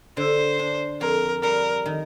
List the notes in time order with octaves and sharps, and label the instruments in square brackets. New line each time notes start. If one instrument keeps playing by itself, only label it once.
[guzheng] D3 [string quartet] C5
[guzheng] D4
[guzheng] F2 [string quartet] A#4
[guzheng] G3 [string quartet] A#4
[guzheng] D#3